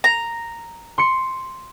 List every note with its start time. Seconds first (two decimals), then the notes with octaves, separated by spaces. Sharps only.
0.04 A#5
0.98 C6 C#7